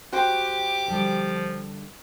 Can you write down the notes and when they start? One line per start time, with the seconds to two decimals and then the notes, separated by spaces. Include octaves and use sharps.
0.13 F#4 G4 C5 G5 D6
0.88 D3 F3 G3